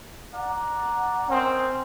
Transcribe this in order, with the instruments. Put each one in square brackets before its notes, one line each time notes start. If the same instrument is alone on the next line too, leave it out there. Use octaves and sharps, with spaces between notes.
[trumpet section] D5 F#5 A#5
[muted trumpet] C4 [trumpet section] C#4 A#4 D#5